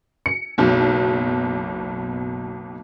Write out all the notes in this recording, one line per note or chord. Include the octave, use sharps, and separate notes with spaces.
C#7
F#1 B1 B2